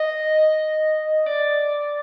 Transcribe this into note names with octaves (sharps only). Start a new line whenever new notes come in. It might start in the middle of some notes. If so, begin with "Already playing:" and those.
Already playing: D#5
D5